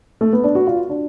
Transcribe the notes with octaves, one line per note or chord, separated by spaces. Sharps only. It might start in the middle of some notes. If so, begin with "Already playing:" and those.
A3
B3
D4
F#4
F4
D4